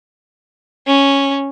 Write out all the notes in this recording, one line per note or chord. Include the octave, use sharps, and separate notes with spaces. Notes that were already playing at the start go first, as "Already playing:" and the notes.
C#4